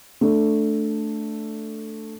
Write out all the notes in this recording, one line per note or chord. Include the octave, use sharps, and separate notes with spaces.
A3 D4